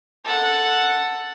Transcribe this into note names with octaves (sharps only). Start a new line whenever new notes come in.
A4 F#5